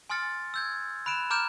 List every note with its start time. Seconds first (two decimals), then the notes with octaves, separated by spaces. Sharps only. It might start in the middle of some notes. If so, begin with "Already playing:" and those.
0.10 G#5 C6 D#6 F6 A6 C#7
0.54 E6 G6 G#6
1.06 B5 F#6 D7 E7
1.30 A#5 D6 F6 G6 D7 E7